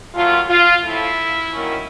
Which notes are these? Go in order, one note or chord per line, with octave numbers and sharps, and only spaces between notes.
A#2 F#3 A3 F4
F4
A2 F3 A3 E4
D#3 F#3 A#3 C#4